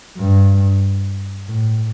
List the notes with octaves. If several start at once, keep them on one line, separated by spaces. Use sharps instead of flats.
G2
A2